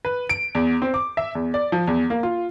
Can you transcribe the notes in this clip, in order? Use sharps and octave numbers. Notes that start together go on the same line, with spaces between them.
B4
D7
E2
C4
D6
E5
E2
D5
F3
E2
A#3
F4